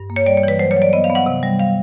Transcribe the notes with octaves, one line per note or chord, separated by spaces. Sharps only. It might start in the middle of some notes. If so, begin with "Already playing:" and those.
Already playing: G2
A#3
C#5
G3 D5
C#5
E3 B4
F#3 C5
C#5
F#3
D5
B3 D#5
F5
B3
F#5
C3
G3
F5